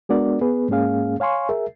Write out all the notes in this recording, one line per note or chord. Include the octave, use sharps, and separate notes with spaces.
G#3 B3 D4 F#4 A#4 D5
B3 G#4 B4
G#2 G#3 A#3 C#4 G#4 F5
C#5 F5 G#5 C6 C#6
G#4 A#4 E5